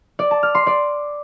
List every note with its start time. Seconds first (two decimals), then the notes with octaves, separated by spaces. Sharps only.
0.19 D5
0.31 A5
0.43 F6
0.55 C6
0.67 D5